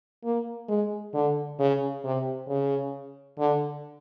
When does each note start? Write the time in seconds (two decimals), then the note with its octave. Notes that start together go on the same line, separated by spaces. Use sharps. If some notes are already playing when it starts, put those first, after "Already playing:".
0.24 A#3
0.69 G#3
1.14 D3
1.59 C#3
2.04 C3
2.49 C#3
3.38 D3